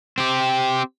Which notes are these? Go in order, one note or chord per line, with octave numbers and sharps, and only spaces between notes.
C4 G4